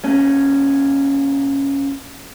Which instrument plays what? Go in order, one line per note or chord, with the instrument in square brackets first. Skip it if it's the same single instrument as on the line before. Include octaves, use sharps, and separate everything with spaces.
[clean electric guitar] A#2 C#4